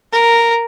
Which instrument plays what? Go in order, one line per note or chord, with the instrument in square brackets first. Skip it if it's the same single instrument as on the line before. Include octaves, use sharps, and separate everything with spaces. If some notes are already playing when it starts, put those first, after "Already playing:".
[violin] A#4